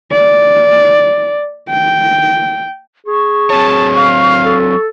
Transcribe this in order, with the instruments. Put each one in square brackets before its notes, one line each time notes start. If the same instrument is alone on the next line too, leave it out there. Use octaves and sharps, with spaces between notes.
[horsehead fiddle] D5
G5
[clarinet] G#4 [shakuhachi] C#6
[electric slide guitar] F#3 C4 C#5 [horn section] A5
[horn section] F5
[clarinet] A4